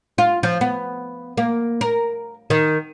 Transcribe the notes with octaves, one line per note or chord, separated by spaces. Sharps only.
F4
F3
B3
A#3
A#4
D#3